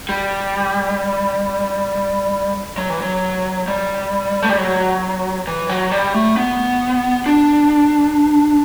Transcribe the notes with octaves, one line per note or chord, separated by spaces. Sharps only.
G3
F#3
E3
F#3
G3
A3
G3
F#3
E3
F#3
G3
A3
B3
D4